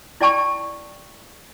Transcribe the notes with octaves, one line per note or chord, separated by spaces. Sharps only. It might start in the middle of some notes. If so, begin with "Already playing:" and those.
E4 D5 G5 A5 C#6